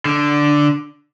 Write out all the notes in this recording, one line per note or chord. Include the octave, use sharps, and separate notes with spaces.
D3